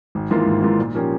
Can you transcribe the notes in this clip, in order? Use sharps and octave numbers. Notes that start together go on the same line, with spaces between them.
G#1
G#2 E3 A#3 F4
G#1
G#2 E3 A#3 F4
A#2
F3 A#3 C#4 G4